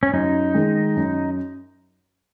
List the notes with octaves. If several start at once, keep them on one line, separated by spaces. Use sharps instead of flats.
C#4
F#2 D#4
D#3 G#3
F#2